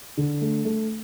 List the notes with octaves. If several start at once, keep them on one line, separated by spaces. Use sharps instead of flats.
D3
A3
A3